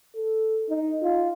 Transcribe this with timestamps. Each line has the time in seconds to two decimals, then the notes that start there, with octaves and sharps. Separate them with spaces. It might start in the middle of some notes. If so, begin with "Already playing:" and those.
0.15 A4
0.70 D#4
1.03 F4